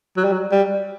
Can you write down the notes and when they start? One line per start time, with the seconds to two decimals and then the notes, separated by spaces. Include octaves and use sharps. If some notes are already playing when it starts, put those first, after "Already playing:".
0.17 F#3
0.24 G3
0.33 F#3
0.51 G3